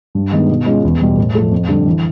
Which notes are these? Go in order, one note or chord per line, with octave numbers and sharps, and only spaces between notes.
G2
D#3 G#3 B3 D#4
B2
G#3 C#4 F4
E2
B2 G3
A2
F3 A3
F2
D3 G3
E3